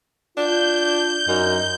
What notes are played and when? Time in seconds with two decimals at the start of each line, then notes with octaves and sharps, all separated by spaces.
0.37 D4 F4 G6
1.28 F#2 D#4